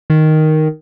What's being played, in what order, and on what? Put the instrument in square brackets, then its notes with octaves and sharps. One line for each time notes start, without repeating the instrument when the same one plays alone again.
[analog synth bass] D#3